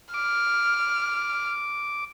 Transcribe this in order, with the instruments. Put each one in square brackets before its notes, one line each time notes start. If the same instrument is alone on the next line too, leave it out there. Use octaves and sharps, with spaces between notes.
[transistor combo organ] D6 [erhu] F6